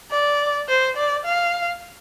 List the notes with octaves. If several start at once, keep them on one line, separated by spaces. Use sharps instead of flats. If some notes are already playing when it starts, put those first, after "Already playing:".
D5
C5
D5
F5